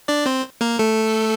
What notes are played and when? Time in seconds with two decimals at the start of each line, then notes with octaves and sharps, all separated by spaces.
0.08 D4 D5
0.26 C4 C5
0.61 A#3 A#4
0.79 A3 A4